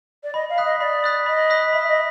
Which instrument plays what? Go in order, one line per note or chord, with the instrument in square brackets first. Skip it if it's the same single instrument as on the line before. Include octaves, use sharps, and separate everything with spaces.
[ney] D5
[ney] D#5 [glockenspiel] B5
[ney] F5
[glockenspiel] D#6 F#6 B6
[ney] D#5
[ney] D5 [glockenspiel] B5
[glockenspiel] D#6 F#6 B6
[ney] D#5 [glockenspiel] B5
[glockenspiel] D#6 F#6 B6
[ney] E5 [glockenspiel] B5
[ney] D#5